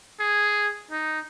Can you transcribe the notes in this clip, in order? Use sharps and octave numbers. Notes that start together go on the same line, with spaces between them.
G#4
D#4